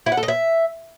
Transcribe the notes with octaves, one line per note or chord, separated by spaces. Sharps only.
E4
F#5
A4
D#5
E5